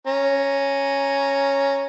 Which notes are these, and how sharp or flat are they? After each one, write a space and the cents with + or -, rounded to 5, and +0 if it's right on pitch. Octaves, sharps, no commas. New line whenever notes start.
C#4 +0 A#5 +0